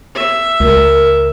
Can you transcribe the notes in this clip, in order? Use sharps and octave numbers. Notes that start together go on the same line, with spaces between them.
E5
C#2 A#4